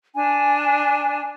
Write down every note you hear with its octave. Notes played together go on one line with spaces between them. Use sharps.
D4 G#5